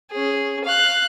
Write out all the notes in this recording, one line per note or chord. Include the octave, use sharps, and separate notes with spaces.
C#4 G#4
F5 F#6